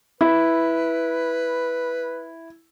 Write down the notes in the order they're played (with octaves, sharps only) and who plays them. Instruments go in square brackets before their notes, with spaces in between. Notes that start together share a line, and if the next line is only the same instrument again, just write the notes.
[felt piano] E4 [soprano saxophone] B4